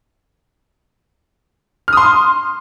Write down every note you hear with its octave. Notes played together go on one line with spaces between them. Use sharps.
C6 D#6 F6